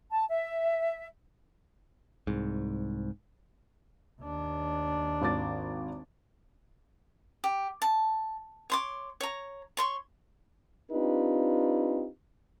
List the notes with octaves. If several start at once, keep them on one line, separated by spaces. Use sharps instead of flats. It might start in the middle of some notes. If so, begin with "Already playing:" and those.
A5
E5
C2 G#2
D#2 D4
G#1 D6 A6
G4
A5
C#5 C6 D6
C#5 A#5
C#5 C6 C#6
C4 D4 D#4 F4 G4 B4